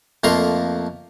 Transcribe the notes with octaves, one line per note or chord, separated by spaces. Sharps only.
F2 A3 A#3 A#5 C6